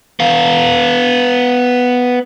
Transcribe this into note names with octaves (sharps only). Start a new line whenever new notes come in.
B3 F5